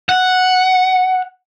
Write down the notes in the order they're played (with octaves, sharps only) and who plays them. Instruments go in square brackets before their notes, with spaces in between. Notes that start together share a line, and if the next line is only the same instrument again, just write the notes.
[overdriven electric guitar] F#5